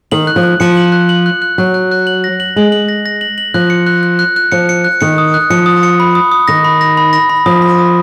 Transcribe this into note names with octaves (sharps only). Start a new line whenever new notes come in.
D#3 F#7
F#6
F3
F#6
F3 C#7
F#7
F#6
F#7
F#6
F#6
F#3 F#6
F#6
F#6
F#7
A#6
F#7
G#3 F#7
F#7
A#6
A#6
F#7
F#7
F3 F#6
C#7
F#6
F#6
F#6
F#6
F3 C#7
C#7
F#6
D#3 C#7
D#6
F#6
F3 C#7
D#6
C#7
B5
D#6
D#6
D#3 A#6
B5
A#6
B5
A#6
B5
F3 D#6
B5
D#6